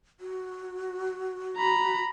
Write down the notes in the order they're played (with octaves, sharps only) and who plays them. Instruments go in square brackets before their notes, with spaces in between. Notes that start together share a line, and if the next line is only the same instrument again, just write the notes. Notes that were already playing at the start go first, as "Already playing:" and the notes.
[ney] F#4
[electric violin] A#5 B5